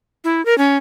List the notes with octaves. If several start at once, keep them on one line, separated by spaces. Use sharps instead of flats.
E4
A#4
C#4